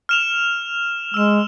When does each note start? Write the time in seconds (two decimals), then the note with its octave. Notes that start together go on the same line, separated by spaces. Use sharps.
0.09 F6 E7 F7
1.14 G#3 E6 E7